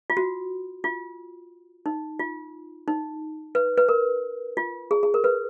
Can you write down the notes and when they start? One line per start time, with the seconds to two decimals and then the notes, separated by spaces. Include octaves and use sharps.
0.10 F4
0.17 F#4
0.84 F4
1.86 D#4
2.19 F4
2.88 D#4
3.55 B4
3.77 B4
3.89 A#4
4.57 F4
4.91 G#4
5.03 G#4
5.14 A#4
5.24 B4